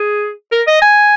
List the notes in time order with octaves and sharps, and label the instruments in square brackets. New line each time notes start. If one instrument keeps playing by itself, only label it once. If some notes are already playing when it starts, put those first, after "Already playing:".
Already playing: [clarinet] G#4
A#4
D#5
G#5